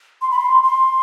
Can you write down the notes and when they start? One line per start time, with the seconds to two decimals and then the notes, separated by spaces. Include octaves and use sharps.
0.22 C6
0.31 B5
0.39 C6
0.63 C6